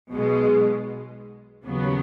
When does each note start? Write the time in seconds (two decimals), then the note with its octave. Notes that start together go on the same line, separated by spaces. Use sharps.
0.11 B1 B2 G#3
1.66 D#2 C#3 F#3 B3